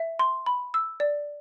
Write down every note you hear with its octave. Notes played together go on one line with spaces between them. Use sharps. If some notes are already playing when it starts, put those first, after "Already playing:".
Already playing: E5
C6
B5
E6
D5